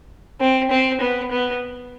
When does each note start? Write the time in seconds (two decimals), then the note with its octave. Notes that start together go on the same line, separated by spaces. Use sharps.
0.40 C4
0.70 C4
1.01 B3
1.31 B3